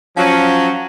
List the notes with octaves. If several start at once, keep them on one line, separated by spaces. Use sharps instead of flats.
F3 F#3 C#4